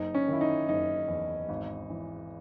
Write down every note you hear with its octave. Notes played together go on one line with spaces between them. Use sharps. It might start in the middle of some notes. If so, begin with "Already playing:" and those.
Already playing: F#1 D#4
C#4
D#3 E4
D#4
F#1 D#4
E2
G#1
E3